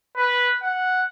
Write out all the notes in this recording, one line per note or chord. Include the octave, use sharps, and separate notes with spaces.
B4
F#5